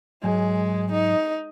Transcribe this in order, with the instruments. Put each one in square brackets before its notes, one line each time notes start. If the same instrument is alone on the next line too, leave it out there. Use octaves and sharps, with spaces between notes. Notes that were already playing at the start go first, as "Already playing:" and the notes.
[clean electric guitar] G#2 F#3 G#5 [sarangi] G#3
[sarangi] D#4